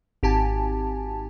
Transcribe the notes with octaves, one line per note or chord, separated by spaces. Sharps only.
G#1 G4 G#5 A5